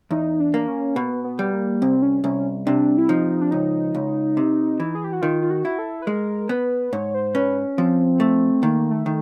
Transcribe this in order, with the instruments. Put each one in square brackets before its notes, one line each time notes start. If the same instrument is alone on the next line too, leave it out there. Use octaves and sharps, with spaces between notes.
[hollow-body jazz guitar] E2 [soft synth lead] D#4
[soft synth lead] D4
[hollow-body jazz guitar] A#3
[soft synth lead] C#4
[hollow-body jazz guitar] B2 [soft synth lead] B3
[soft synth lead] B3
[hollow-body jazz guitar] G3
[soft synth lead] A#3
[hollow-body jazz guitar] C2 [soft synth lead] C4
[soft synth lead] C#4
[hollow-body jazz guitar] C2 [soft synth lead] C#4
[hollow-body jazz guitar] C3 [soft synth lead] D4
[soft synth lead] E4
[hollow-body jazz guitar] F3 [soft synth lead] D#4
[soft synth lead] D4
[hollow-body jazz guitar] C#2 [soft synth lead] D#4
[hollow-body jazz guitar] C#2
C3
E3
[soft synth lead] G#4
G4
F#4
[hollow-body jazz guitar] D#3 [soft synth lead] F4
[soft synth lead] F4
F#4
[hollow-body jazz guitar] E4
[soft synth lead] A4
B4
[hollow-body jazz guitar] G#3 [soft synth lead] A#4
[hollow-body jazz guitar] B3 [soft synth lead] B4
[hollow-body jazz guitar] G#2 [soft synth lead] C#5
[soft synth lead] C5
[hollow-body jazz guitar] C#4 [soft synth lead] B4
[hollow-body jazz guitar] F3 [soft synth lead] C4
[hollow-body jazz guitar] A3
[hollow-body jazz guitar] D#3 [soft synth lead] A#3
[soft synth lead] A3
[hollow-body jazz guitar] D#3